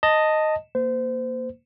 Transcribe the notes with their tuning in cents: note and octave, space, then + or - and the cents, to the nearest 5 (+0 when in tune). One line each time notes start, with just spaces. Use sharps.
D#5 +0 A5 +15
A#3 +0 C5 -30